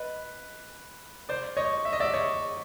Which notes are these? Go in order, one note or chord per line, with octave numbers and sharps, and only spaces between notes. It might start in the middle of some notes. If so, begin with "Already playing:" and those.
Already playing: B4 D#5
C5 D5
C#5 D#5
E5
D#5
D5 E5
C#5 D#5